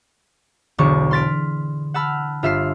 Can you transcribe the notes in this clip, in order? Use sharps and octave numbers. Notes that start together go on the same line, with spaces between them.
E1 B1 D3 C#6
C6 F6 A6 B6 D7
F#5 A5 B5 E6 F6
G1 F4 E5 E6 F6 C7